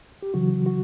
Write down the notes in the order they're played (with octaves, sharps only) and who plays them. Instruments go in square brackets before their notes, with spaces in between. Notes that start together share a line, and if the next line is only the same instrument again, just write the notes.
[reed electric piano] G4
C#3 E3 F#3 F#4
F#4